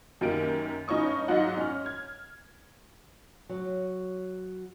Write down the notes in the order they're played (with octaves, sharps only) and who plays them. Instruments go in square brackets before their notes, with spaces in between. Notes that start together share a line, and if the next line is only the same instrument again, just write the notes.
[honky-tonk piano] F#2 D#3 A#3 G4 D7
G2 C#4 D#4 C#5 C#6 D#6
G#2 F#3 D#4 F4 D#5 F#5
C#4 F6
G#6
[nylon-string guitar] F#3